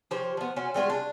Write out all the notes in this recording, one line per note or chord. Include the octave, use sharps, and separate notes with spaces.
F3 G4 C5 C#5
F3 B3
C#4 F4 F#4
G3 G#3 F4 F#4
D4